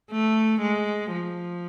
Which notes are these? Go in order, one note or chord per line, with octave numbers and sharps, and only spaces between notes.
A3
G#3
F3